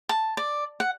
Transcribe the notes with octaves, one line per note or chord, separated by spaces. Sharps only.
A5
D5
F#5